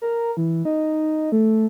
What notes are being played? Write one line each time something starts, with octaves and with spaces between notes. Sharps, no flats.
A#4
E3
D#4
A3